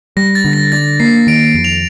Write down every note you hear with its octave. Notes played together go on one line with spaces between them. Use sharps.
G3 A#6
A6
D3
A#6
D4 A6
A#3 C7
D#3 D7
F2
F7